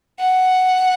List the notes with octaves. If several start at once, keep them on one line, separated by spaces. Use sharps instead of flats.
F#5